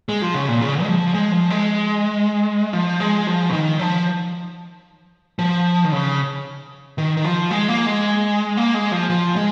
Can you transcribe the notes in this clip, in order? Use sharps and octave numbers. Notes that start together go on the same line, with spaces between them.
G#3
F3
C#3
A#2
C#3
G#3
F3
G#3
F3
G#3
F3
G#3
F3
C#3
D#3
F3
F3
D#3
C#3
D#3
D#3
F3
G#3
A#3
G#3
A#3
G#3
F3
F3
G#3